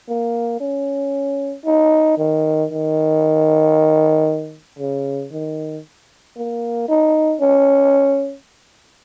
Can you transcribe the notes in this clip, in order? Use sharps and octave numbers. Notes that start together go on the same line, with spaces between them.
A#3
C#4
D#4
D#3
D#3
C#3
D#3
A#3
D#4
C#4